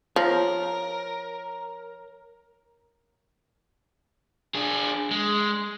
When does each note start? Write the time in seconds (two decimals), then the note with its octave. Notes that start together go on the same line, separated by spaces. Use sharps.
0.16 F3 A#4 C#5 F6 A#6
4.55 D4 G#4
5.11 G#3